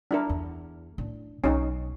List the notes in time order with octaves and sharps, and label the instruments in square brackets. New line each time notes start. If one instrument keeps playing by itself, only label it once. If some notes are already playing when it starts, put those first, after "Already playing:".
[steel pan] D4 E4 A#4
[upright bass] E2
A2 D4
[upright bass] B1 [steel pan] C#4 D#4